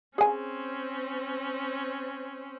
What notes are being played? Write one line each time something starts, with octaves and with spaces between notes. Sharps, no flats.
C4 C#4 G#4 G#5